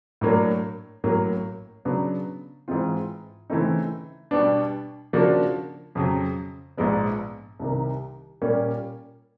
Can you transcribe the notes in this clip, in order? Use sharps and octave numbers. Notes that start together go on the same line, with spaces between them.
A2 F#3 A#3 D4
A1 A2 F#3 A#3
C#3 F#3 B3 D4
G#2 E3 G#3 C4 F4
C#3 E3 A3 C4 D#4
B2 G3 B3 D4
C#3 F3 A#3 D4 F#4
F2 C#3 F#3
A#1 G#2 F3 G#3 B3
C2 C3 D#3
A#2 G3 A#3 C#4